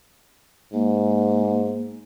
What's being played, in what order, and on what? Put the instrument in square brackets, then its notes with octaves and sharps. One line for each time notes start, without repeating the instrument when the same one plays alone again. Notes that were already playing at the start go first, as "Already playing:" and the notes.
[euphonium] G#2 [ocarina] A#3